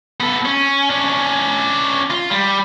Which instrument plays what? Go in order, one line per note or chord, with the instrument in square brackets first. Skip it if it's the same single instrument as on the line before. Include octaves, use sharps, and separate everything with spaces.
[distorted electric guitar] B3 A4
C#4
C#4 D4
F4
G3